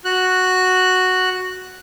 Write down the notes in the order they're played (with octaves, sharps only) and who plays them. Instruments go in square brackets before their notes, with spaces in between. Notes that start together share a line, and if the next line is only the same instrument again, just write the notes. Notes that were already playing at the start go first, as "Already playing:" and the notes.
[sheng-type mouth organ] F#4 F#6